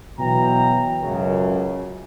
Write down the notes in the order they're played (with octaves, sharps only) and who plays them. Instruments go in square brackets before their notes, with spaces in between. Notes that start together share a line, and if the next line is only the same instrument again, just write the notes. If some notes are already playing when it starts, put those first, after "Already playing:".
[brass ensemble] B2 E3 F#3 G5 A#5
C#2 F#2 C#3